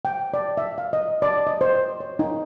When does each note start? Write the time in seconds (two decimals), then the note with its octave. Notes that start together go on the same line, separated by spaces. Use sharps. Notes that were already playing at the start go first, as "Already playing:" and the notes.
0.05 G5
0.34 D5
0.57 E5
0.78 F5
0.93 D#5
1.22 D5
1.47 D#5
1.61 C5
2.00 C#5
2.19 D#4